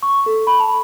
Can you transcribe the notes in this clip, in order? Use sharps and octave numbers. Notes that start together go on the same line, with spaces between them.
C#6
A4
B5
A5